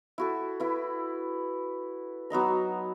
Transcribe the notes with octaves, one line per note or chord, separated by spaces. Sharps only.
E4 F#4 A4
E4 B4
F#3 B3 D#4 A#5